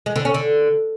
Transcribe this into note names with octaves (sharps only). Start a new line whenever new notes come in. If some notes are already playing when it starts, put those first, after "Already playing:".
G#3
D3
C#4
D3